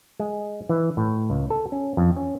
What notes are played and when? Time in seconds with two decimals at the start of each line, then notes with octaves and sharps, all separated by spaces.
0.20 G#3
0.69 E3
0.97 A2
1.30 C#2
1.50 A4
1.72 C#4
1.97 F2
2.16 C#4